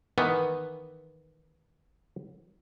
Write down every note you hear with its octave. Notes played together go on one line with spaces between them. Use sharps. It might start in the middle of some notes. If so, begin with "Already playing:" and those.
D#3 E3 B3